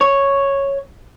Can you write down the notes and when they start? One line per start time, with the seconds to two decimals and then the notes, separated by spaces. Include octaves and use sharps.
0.01 C#5